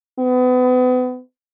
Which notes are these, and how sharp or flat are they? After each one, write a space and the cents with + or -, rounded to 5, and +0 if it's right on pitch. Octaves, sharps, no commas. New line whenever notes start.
B3 +35